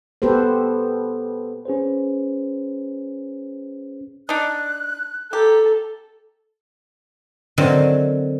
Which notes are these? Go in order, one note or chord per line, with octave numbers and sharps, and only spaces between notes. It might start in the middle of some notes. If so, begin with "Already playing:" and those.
B3 G4 A4 B4 C5
C#4 G#4 B4 C5
D4 D#4 F#6
G4 A4 A#5
D3 D#3 F#3 C4